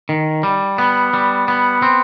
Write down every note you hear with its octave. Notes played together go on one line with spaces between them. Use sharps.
D#3
G3
B3
G3
B3
C4